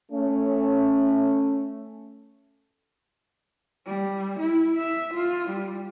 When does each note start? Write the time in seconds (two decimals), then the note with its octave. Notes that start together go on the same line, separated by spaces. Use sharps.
0.12 A3 C#4
3.87 G3
4.39 E4
4.78 E5
5.14 F4
5.50 G3